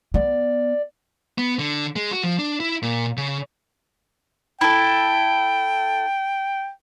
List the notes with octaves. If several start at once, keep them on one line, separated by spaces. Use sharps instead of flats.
B3 D5
B3
D3
G#3
F#4
F3
D4
E4
A#2
C#3
E4 A4 G5